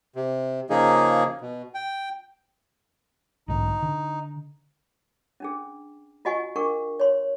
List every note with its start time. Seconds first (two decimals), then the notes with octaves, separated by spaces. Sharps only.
0.16 C3
0.70 C#3 F3 A#3 D#4 G#4
1.41 B2
1.74 G5
3.48 B1 G#2 D3 D#4
3.83 D3
5.40 C#4 D4 G#4
6.25 F4 F#4 D#5 F#5 G#5 C#6
6.56 D4 G#4 A#4 F#5 C#6
7.00 C#5 C6